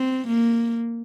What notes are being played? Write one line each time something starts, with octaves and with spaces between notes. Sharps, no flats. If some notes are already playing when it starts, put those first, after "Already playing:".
Already playing: C4
A#3